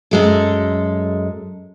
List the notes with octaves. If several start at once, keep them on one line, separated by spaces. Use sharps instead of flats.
F#2 G#3 A4